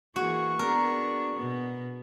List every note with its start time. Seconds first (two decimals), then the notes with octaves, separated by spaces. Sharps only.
0.16 E3 A#3 F#4 G#4 C#6
0.59 B3 D4 G#4 A#4
1.35 B2 B3